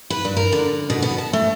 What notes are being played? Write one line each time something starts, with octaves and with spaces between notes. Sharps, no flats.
B4
G2
A#4
D3
B2
B3
A5
A3